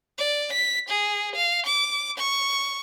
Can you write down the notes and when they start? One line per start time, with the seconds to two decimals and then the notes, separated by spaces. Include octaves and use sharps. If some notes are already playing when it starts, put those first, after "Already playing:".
0.18 D5
0.53 B6
0.89 G#4
1.35 F5
1.66 D6
2.18 C#6